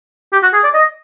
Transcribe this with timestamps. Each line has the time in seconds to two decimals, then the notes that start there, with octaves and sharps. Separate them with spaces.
0.33 G4
0.43 F#4
0.53 G#4
0.64 D5
0.74 D#5